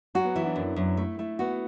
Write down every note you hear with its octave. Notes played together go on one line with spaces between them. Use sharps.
F#3 F#4
B3
E3 E4
D4
F#2
F#2 E4
A3 E4
A3 E4
B3 F#4